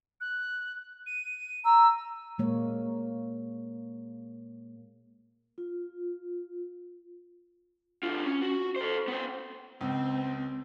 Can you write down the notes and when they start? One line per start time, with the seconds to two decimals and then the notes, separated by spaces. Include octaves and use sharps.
0.21 F#6
1.06 D#7
1.65 A#5 E6
2.38 A#2 G#3 A#3 C#5
5.58 F4
8.03 D3 F4
8.26 C#4
8.42 F#4
8.76 A4 C5
9.08 B3 C5
9.81 C#2 C4